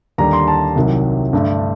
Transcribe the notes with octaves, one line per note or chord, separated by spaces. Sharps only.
D#2 D3 G3 A#5
C6
A5
C2 C3 D#3 F#3
G2 D3 A3